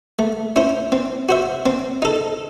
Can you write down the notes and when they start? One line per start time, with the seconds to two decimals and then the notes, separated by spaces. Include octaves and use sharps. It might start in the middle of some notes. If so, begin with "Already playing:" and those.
0.19 A3
0.56 C#4 E4 C5
0.92 C4
1.29 F#4 C5 E5
1.66 C4
2.02 D#4 A4